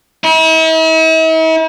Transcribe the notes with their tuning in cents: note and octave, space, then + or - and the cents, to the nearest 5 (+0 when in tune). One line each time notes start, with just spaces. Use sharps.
E4 -45